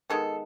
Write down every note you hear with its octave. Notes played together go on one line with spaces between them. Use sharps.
D#3 G#3 B3 A4